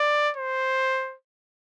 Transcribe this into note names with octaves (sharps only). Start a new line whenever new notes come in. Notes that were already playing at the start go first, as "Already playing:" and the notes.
Already playing: D5
C5